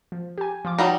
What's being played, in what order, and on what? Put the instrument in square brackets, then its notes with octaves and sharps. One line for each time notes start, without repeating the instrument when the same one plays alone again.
[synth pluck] F3
G4 G#5
F3 F4 D6
[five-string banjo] F#3 G3 D#4 [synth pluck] F#4 A5